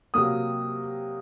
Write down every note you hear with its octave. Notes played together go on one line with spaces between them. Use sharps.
C3 F#3 A#3 D#6